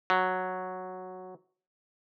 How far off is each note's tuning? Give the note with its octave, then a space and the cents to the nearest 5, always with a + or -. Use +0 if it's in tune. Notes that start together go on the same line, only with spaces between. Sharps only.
F#3 -5